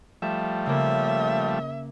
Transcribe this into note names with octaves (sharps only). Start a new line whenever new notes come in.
F3 G3 A3 E5
C#3 A#3 E5